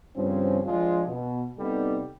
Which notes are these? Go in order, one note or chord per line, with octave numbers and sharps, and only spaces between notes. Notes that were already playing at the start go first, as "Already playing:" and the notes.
G2 C#3 F3 C4 C#4
F3 G#3 D4 F4
B2
C3 G3 B3 D#4 A4